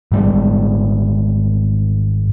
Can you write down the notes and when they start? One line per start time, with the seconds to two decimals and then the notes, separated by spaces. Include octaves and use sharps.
0.12 G#1 G3 G#3